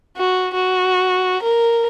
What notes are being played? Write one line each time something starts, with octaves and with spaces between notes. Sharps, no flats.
F#4
F#4
A#4